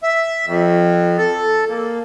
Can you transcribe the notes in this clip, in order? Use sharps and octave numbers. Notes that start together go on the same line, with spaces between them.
E5
F2
A4
A#3